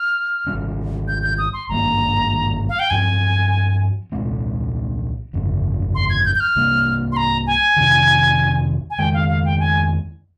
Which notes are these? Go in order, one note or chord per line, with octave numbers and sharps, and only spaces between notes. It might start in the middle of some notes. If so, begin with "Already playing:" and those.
Already playing: F6
G#1 G2 G3 C#4
G6
G6
D#6
C6
G#1 G2 G3 A#3 A#5
F5
G5
G2 F3 C4 G#5
C2 A#2 G#3 C4
G1 F2 C#3
C6
G#6
G6
G6
F6
C2 C3 G3 A#3
C6
A#5
G#5
F2 C3 D#3
G#5
F2 D#3 G#3 G5
F5
F5
G5
G#5